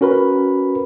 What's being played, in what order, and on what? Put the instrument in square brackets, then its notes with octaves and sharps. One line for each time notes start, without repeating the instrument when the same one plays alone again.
[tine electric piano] C#4 F#4 A#4 B4 B5